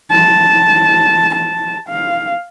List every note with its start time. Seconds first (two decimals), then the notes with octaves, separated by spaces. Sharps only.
0.11 A5
1.35 A5
1.89 F5